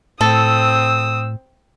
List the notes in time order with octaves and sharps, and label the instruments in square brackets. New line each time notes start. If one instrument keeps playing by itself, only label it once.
[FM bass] A2 [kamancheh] C4 D#6 [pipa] A4 [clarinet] E6